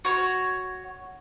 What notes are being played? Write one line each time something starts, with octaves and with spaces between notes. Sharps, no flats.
F#4 C#5